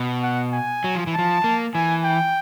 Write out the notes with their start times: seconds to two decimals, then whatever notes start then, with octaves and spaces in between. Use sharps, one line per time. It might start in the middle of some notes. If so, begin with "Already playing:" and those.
Already playing: B2
0.23 F#5
0.53 G#5
0.84 F#3
0.95 F3
1.07 E3
1.14 F3 A5
1.44 A#3
1.74 E3 G#5
2.04 G5